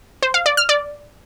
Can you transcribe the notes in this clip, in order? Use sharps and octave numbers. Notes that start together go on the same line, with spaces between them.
C5
F5
D5
F6
D5